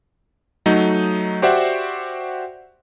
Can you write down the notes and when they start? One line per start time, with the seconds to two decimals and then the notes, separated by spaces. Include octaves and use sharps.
0.66 F#3 A3 D#4
1.42 F#4 G4 C5 D5 E5 F#5